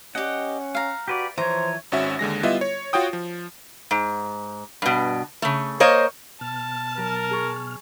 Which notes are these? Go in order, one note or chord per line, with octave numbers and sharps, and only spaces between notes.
C#4 G4 D#5 F#5
F5 A#5
F#4 G4 B4 D5
E3 F3 C5 C#5 A#5
G#1 C#4 F#4 E5
D#2 D3 G#3 A#6
G3 B3 E4 F4 D#5 E5
C#5
F4 F#4 C#5 G5 D#6
F3
G#2
G2 B2
C#3 A3
A#3 C5 C#5 D#5
B2 A5 F6
F#3 A#4
G#4 C#6